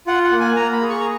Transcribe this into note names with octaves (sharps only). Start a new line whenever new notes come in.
F4 F#5
F#5
A#3
G#5
A#3 A#5
B5
G#4
C#6
A#5